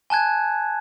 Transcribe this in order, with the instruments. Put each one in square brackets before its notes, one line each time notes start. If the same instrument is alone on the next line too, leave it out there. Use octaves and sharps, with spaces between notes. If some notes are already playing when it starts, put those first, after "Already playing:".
[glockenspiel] G#5 A5 F#6 G#6